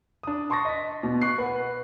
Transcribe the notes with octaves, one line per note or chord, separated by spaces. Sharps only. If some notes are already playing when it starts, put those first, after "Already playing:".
D4 D#6
A5 C6 C#6 A6 A#6
D#5 B6
B2
C#6 F#6 C7
B4 F#5